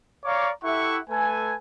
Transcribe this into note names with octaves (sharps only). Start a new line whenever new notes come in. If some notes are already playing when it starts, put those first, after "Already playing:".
C#5 D5 F5 A#5 C#6 D6
E4 G4 A4 E5 F#5 C#6
A3 A4 B4 G#5